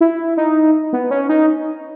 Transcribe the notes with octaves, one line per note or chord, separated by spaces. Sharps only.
E4
D#4
B3
C#4
D#4